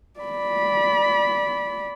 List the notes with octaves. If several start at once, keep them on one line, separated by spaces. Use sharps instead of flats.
D5 B5